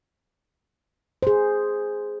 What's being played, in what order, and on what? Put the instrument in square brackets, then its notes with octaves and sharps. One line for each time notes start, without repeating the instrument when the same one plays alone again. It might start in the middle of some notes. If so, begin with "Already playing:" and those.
[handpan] G#4 C5